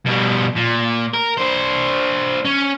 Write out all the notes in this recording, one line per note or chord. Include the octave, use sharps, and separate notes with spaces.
B2 G3
A#2
A#4
D4 C5
C#4